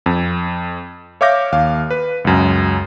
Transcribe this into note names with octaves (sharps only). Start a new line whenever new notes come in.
F2
C#5 E5 F5 D6 G6 A#6
D#2 F5
B4
C#2 F#2